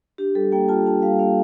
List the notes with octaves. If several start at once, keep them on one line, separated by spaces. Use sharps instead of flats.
D4 G4
G3 A4
A#3 G5
F4 A5
D4 A5
G3 F5
A#3 F5